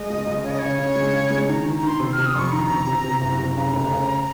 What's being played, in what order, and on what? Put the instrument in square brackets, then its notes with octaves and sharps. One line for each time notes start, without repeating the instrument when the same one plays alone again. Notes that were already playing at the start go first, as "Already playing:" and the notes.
Already playing: [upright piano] G#3 [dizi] D#5
[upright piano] C#2
C#2
[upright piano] C#3 [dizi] C#5
[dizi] D#5
[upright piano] C#3 [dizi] C#5
[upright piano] C#3
G#3
C#3
G#3
[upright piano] D#3 [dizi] A#5
[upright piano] D#3
[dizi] A#5
[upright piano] D#3 [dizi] C6
[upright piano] C3
[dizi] F6
[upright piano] C3
[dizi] D#6
[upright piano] F2 [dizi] C6 C#6
[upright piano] D#3 [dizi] A#5
[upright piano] C3
C3
C3
F#1
C3
[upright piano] C#3 [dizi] A#5
[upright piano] F1
C#3